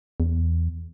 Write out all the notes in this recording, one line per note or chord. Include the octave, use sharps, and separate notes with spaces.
E2